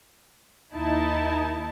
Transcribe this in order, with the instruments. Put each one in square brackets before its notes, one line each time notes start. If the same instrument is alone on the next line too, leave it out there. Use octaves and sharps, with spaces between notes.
[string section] D#2 D#4 E4 A5